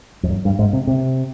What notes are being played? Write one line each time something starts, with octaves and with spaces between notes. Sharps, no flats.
F2
F#2
G2
G#2
C3
C3